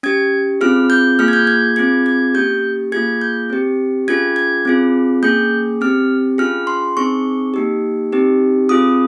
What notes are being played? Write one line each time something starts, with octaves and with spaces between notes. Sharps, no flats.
C#4 G4 G#6
C4 F4 G#4 F6
G6
A#3 F4 G#4 F6
G#6
G6
G#6
C4 F4 G#4 G#6
G#6
A#3 C#4 G4 G6
A#3 F4 G#4 G#6
G6
C4 G4
C#4 F4 G#4 G#6
G#6
C4 F4 G#4
A#3 C#4 G#4 G6
C4 G4 F6
C#4 F4 G#4 F6
C6
C4 D#4 G#4 C#6
A#3 D#4 G4
C4 D#4 G4
C4 F4 G#4 D#6